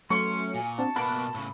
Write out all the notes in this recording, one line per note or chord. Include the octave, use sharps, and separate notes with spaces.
F#3 A3 C#4 C6 C#6
A#2 G#5
C4 D4 F#4 A5
B2 A#3 B3 B5 F#6 D7
A2 C#3 E6